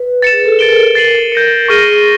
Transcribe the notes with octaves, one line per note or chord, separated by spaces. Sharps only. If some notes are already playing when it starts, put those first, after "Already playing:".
Already playing: B4
A6 C#7 E7
G#4
A4
A#4 A6 D7 G7
A6 C7 D#7 F#7
G6 A#6 C#7
G#4 C#6 F6 A#6 D#7 G7